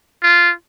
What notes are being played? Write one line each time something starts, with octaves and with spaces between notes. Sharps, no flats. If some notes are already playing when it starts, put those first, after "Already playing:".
F4